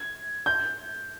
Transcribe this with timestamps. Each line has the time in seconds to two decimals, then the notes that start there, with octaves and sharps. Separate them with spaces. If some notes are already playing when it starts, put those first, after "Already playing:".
Already playing: G#6
0.46 G6